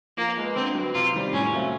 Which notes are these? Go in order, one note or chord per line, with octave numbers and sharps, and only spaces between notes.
F3 A#3
G#3 B3
D3 C4
F#3 B3
C3 F4
D#3 G3 C4
A2 C#4
F#3 A3 C4 F4